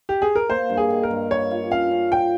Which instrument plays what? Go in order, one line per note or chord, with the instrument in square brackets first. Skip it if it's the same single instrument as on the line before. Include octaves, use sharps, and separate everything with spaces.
[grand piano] G4
G#4
A#4
[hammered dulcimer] A#3 [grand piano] C5
[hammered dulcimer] G2
[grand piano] G#4
[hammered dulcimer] D#3
[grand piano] A#4
[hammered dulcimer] G2
[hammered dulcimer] G3 [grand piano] C#5
[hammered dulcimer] F4
[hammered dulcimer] C#4 [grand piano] F5
[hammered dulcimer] C#4
[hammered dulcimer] F4 [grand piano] G5